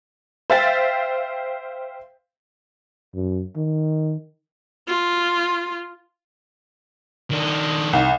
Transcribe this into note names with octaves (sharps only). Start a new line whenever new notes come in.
C5 E5 F5 G5 A6 B6
F#2
D#3
F4
D#3 D4
C2